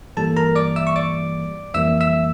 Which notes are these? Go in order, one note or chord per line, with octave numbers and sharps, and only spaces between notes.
G2 E3 G3 A#3 A4 A5
A#4 A#5
D5 D6
E5 E6
C#6
D5 D6
F2 E3 G3 A#3 E5 E6
E5 E6